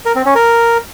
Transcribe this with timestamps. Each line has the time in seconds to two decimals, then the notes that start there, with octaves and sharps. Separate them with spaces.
0.05 A#4
0.15 C4
0.25 C#4
0.35 A#4